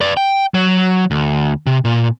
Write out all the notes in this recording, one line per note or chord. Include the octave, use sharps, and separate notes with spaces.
B4 D5
G5
F#3
D2
C3
A#2